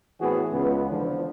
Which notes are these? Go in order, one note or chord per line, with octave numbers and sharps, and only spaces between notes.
A2 E3 B3 C4 F#4 G#4
C#2 B3
E2 D3 E3 F3